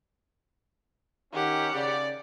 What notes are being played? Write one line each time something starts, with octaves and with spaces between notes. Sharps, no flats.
D#3 C#4 G4 F#5
C#3 D5